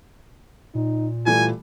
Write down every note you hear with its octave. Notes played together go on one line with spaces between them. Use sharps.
A#2 D#4
E3 G3 A3 F4 G#5